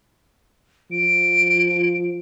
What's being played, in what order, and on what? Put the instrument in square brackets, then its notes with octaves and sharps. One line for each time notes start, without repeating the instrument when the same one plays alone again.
[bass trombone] F3 [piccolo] D7